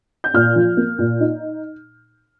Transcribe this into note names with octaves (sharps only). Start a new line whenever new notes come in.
G6
A#2 F6
F3
A#3
A#2
D#4